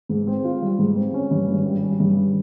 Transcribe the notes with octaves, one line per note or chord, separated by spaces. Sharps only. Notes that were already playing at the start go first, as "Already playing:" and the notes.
G#2
C4
F4
G3
G#2
C4
C#4
G2
G#1
G3
C#4
G2